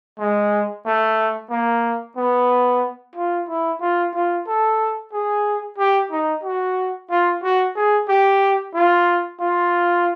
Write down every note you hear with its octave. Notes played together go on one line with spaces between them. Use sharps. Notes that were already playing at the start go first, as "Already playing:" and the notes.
G#3
A3
A#3
B3
F4
E4
F4
F4
A4
G#4
G4
D#4
F#4
F4
F#4
G#4
G4
F4
F4